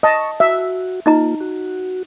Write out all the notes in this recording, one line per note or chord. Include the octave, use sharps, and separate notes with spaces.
D#5 A5 C#6
F#4 E5
A#3 D#4 F4 D#5 A#5
F#4